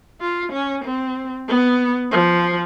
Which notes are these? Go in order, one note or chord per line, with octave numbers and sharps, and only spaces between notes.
F4
C#4
C4
B3
F3